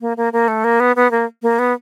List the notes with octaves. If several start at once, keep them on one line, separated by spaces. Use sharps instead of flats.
A#3
A#3
A#3
A3
A#3
B3
B3
A#3
A#3
B3